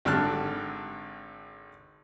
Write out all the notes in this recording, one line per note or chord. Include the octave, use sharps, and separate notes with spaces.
G#1 D3 G4 A5 F6 F#6